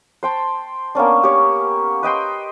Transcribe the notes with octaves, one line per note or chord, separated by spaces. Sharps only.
C5 G5 A5
A#3 B3 C#4 D4
G4 C#5
B4 D#5 G5 C6